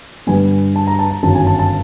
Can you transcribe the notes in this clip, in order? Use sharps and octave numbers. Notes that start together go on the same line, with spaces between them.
G2 D3 G3 B3 G#5
A5
A#5
A5
A#5
G1 F#2 D#3 F#3 A5
G#5
A5
A5